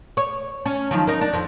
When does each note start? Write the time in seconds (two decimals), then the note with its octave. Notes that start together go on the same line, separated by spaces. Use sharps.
0.17 C#5
0.66 C#4
0.91 D#3 F3 F#3
1.07 D#4 A#4
1.21 D4
1.33 F2